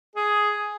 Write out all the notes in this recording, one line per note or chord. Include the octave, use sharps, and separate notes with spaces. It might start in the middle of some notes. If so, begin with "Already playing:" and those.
G#4